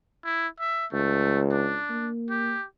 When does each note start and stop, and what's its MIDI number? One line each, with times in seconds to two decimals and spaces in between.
0.24 0.47 64
0.60 0.86 76
0.93 1.77 37
0.93 1.41 57
1.51 2.09 62
1.90 2.56 58
2.30 2.65 67